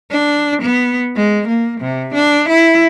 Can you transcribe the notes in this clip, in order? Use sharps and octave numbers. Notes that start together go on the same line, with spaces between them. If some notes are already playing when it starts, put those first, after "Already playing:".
D4
B3
G#3
A#3
C3
D4
E4